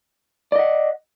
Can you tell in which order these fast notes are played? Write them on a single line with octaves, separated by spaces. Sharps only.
D5 D#5 F#5